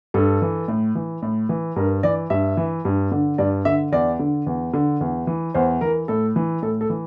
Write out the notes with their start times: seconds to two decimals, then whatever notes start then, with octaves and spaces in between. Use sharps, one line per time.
0.14 G2 A4
0.42 E3
0.68 A2
0.95 E3
1.22 A2
1.49 E3
1.76 G2 A#4
2.03 E3 D5
2.30 G2 E5
2.57 E3
2.85 G2
3.12 D3
3.38 G2 D5
3.65 D3 E5
3.92 E2 D5
4.19 D3
4.46 E2
4.74 D3
5.01 E2
5.27 E3
5.54 E2 C5
5.81 E3 A#4
6.08 A2 A4
6.36 E3
6.62 A2 A4
6.81 A4
6.90 E3